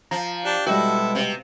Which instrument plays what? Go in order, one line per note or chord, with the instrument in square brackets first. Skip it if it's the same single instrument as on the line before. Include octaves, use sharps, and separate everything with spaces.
[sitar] F3 [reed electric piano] A#5
[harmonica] D4 G4
[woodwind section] B2 G#3 [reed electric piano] G3 G5 [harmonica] E4 A4 [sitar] F#4
[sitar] C3